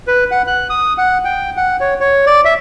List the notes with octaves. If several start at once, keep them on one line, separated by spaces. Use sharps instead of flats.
B4
F#5
F#6
D#6
F#5
G5
F#5
C#5
C#5
D5
E5